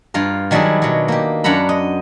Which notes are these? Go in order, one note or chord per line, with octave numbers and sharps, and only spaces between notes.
G2 F4 F5 A#5
D#3 F#3 G3 D4 E4 G#4
B2 F#3
A#3 G4
F#2 D4 F#5 A#5 B5
D#5